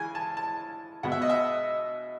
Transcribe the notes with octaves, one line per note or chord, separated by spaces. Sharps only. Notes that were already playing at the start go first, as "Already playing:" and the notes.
Already playing: C#3 E3 G#3 G#5
A5
A5
B2 G#3 B3 F#5
E5
D#5
E5